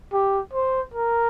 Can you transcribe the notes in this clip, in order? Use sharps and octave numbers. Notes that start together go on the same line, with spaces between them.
G4
C5
A#4